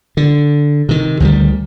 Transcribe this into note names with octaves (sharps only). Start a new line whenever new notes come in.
D3
C3 D#3
D2 D#3 F#3 G3